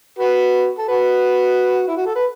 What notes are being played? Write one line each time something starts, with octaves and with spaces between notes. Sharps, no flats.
F#4 B4
A4
F#4 B4
E4
F#4
A4
B4